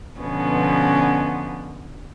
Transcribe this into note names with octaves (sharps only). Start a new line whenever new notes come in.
B2 D3 F3 B3 C#4